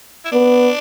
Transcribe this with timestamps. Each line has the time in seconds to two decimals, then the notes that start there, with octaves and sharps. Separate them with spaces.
0.25 E4
0.32 B3 D4